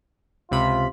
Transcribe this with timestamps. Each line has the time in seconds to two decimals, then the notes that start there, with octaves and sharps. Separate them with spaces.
0.51 C#2 C3 F4 B5